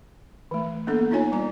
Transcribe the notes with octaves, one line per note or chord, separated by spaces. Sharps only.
E3 A3
A#3 B3 D4 A4
D4 D#4 F4 C#5 G#5
G3 A#5